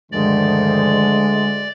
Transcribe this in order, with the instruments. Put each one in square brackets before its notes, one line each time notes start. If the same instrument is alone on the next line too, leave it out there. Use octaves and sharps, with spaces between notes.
[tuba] D2 [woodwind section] G2 D#3 F3 [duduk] G#3 [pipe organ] D5